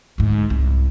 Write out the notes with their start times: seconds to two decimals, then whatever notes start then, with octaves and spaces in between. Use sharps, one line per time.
0.18 D2 G#2
0.50 C2